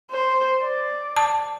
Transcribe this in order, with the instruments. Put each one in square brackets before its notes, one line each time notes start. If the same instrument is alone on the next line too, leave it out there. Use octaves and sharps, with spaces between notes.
[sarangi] C5
D5
[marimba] A5